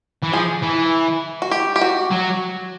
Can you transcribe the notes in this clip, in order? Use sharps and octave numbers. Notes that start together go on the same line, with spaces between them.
E3
F3 G#4
E3
F#4
G4
G4
F#4
F#3